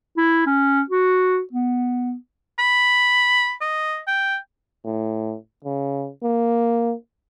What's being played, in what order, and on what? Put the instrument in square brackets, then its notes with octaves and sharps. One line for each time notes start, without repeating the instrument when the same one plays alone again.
[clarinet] E4
C#4
F#4
B3
[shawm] B5
D#5
G5
[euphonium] A2
C#3
A#3